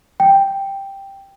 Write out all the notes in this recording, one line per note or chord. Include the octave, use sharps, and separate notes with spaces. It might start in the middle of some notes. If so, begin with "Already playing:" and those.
G5